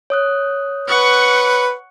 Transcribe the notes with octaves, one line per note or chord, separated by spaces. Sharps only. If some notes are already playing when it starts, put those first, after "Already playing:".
C#5 D#6 F#6
B4 F#5 C#6